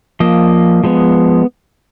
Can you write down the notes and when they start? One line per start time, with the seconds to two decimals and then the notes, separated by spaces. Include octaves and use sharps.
0.20 F3 A#3 D#5
0.84 F3 G#3 B3